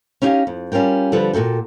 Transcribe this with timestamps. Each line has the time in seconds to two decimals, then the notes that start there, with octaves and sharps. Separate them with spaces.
0.22 C#4 D#4 E4 G4 F5 G#5
0.47 F2
0.72 G3 C#4 F4 A#4 G5
1.12 F2 D3 F3 G3 A4 B4
1.33 A#2 F#4 A4 G5